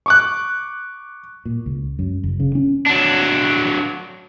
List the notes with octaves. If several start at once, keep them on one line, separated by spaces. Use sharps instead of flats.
C#6 D6 F#6
A#2
C#2
F#2
F#1
C#3
C#4
F#3 D4